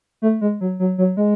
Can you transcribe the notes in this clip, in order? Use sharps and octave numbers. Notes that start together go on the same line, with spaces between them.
A3
G#3
F#3
F#3
F#3
G#3